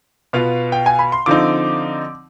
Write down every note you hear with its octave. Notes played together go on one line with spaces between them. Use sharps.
B2 B3 F4 F5
G5
G#5
B5
C6
D3 F3 C4 D#4 D6